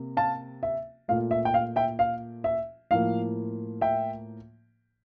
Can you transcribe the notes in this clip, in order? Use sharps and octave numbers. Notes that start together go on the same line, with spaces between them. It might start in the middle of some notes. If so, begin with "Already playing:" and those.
Already playing: C3 A#3
F5 A5
E5
A#2 A3 F5
E5
G5
F5
E5 G5
F5
E5
A2 F3 A#3 F5
E5 G5